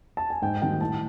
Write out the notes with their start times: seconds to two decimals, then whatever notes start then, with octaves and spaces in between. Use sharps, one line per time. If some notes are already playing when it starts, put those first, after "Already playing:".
0.17 A5
0.30 G#5
0.42 G#2 G5
0.61 D#3 G3 A#3 G5
0.80 A2 A5